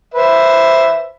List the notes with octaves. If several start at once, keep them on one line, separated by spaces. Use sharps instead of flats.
B4 C5 E5